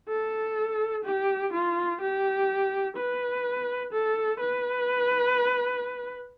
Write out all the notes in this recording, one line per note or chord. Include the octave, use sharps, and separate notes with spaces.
A4
G4
F4
G4
B4
A4
B4